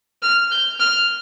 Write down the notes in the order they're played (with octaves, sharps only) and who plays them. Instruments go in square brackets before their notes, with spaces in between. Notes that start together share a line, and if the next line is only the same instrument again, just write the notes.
[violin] F6
G6
F6